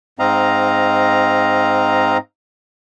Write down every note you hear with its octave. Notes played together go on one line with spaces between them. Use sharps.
G#2 C4 D#5 F5 A#5